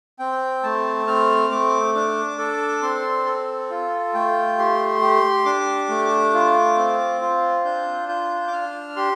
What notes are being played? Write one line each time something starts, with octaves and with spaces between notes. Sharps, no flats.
C4 G5
A3 A5
C4 F6
A3 D6
D4 D6
A4 D6
C4 C6
A4
F4
A3 G5
G4 C6
G4
D4 D6
A3
F4
C4
F4
D4 G6
F4 G6
D6
D4 F6
G4 C6